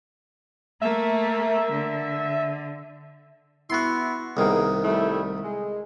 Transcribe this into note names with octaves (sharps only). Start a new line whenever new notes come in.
A3 A#3 E5
D3
B3 E4 F#4 C6
C2 D#3 A#3 B3 G#4
G3 A3 E4
G#3